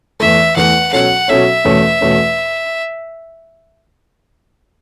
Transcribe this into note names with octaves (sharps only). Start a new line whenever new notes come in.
E2 E3 A3 E5
E2 E3 A3 F#5
B2 F#3 C#4 A4 C#5 F#5
B2 F#3 C#4 A4 C#5 E5
E2 B2 A3 C#4
E2 B2 A3 C#4